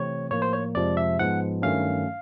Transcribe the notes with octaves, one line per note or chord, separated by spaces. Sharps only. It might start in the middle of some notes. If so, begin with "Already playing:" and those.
Already playing: C3 E3 A3 C4 C#5
A2 F3 A#3 C#5
C5
C#5
F2 C3 F3 G#3 D5
E5
G#2 F3 G#3 B3 F#5
G2 D#3 F#3 A3 C#4 F5